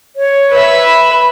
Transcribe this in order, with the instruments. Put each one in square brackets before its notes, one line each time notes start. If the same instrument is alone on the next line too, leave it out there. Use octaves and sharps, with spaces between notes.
[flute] C#5
[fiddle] B4 E5
[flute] B5